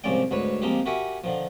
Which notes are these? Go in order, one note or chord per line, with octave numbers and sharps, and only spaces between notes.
C2 G#2 F3 C#4 D5 G5
D2 G#2 B4 C#5
F3 G#3 A#3 C4 D#4 G4
F#4 G4 A#4 E5 G#5 C#6
D3 D#3 F3